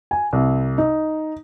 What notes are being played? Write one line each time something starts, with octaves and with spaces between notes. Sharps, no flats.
G#5
C2
D#4